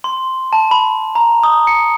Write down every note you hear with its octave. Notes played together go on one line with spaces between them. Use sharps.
C6
A5
B5
A#5
D#6
C#7